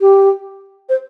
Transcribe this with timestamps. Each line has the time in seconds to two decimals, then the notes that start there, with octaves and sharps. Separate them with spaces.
0.01 G4
0.89 C5